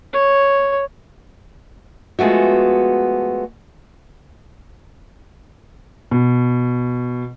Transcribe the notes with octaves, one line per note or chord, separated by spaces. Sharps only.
C#5
F3 G#3 A3 B3 F#4
B2